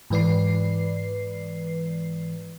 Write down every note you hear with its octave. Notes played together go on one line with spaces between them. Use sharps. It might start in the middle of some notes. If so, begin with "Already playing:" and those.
G#2 E3 B4 D5 C7